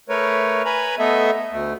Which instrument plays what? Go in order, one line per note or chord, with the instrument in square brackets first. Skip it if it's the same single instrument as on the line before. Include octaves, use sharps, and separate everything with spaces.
[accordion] A3 A#4 B4 C#5
B4 G#5 A#5 B5
A3 B3 A4 D#5 E5
D2 A3